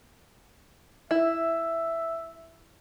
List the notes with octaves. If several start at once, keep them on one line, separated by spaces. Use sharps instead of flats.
E4 E5